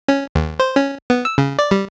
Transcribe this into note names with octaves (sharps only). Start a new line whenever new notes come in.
C#4
D#2
C5
C#4
B3
E6
C#3
D5
G3